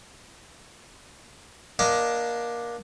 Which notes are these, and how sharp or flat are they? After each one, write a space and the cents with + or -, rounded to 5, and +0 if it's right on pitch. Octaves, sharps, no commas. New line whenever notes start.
A#3 +20 D4 +5 D#5 +25